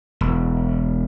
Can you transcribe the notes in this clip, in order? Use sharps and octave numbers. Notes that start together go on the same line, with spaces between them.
E1